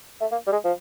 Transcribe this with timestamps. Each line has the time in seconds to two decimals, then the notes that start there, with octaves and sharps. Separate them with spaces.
0.21 A3
0.32 A#3
0.47 G3
0.52 G#3
0.64 F3